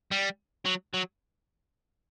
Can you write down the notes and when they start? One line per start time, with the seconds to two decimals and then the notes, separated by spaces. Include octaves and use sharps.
0.11 G3
0.66 F#3
0.94 F#3